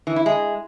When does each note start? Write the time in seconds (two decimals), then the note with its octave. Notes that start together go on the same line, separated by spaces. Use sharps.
0.07 E3
0.16 E4
0.26 G#3